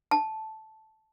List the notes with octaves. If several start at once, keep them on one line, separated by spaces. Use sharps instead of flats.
A5